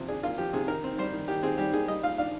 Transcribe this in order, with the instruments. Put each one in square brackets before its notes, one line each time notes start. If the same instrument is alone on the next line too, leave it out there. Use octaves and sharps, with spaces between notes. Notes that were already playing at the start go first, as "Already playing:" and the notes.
Already playing: [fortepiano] C3 F3
D4 G#4
A#3 F4
F3 G4
C3 G#4
D#3 A#4
C4
G3 C5
D#3
D#3 G4
C4 G#4
G3 G4
D#3 G#4
G3 D#5
F4 F5
D4 F5